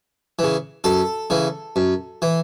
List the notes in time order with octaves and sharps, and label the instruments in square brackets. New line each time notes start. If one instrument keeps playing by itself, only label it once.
[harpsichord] C#3 E3
F#2 A4
C#3 E3
F#2
E3